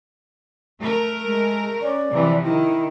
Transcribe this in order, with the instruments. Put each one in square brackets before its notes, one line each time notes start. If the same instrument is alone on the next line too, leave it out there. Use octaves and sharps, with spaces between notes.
[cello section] A3 A#4
[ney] G#3
[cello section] C#4 [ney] D5
[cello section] C3 E3 F3
[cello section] D#3 [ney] E4